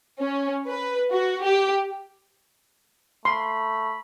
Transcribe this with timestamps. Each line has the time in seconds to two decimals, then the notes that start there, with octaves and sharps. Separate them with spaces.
0.20 C#4
0.68 B4
1.13 F#4
1.44 G4
3.25 A3 B5 C6